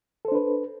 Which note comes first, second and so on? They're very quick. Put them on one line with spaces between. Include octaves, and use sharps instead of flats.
A4 C5 D4 B4